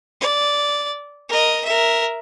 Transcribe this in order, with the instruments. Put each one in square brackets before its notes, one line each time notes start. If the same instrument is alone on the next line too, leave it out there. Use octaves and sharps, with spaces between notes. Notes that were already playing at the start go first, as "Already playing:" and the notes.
[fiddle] D5
A#4 D#5
A#4 E5